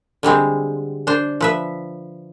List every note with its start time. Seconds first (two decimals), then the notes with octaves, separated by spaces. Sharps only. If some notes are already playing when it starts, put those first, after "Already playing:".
0.23 D3 G3 G#3 C4
1.07 D4 C5
1.41 F3 B4 E5